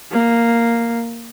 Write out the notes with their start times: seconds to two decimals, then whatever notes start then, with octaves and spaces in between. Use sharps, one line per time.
0.12 A#3